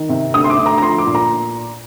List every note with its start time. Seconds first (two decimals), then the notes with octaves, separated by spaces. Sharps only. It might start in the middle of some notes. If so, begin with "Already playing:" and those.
Already playing: D#3
0.09 C3
0.34 D2 D#6
0.44 C6
0.50 D6
0.58 D2
0.66 A#5
0.78 A#5
0.82 F3 C6
0.98 D6
1.06 A#2
1.15 A#5